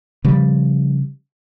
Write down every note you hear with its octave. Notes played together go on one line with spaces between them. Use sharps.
C#3 F3 G3